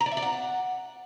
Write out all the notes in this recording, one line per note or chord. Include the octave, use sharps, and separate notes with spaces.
A#5
D5
E5
D5
F#5